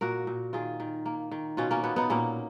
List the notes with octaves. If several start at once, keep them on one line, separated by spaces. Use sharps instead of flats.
A#2 F#4 A#4
A#2
D#3 F4 G#4
D#3
A#3
D#3
B2 C#4 F4
A#3 C#4
B2 B3
B3 D#4
A#2 A#3 C#4